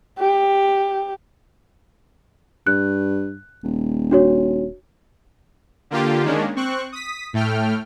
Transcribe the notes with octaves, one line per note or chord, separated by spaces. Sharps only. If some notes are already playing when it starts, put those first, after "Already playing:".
G4
G2 F#6
D#1
D4 F#4 C#5
D3 A#3 F4 G4
D#3 G#3 A#3 C#4 D4
C4 C#6 F#6
D#6 B6
A2 A3 G5 F6